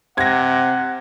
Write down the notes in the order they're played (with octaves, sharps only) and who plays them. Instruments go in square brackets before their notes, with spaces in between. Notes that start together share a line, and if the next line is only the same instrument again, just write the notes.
[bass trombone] C3 [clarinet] F#5 [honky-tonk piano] G#6 A#6